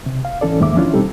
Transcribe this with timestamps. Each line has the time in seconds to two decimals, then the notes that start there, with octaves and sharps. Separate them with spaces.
0.06 C3
0.25 F5
0.41 G#2 E3 C#4 A4 D5
0.60 E2 G#2 D#3 A#3 E5 D6
0.76 E3 F3 C#4 D4 E4 F4
0.93 B2 G3 C4 D#4 G4 A4